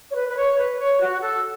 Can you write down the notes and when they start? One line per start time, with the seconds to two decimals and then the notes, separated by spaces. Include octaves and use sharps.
0.10 C#5
0.15 B4
0.28 B4
0.36 C#5
0.58 B4
0.79 C#5
1.00 F#4
1.21 A4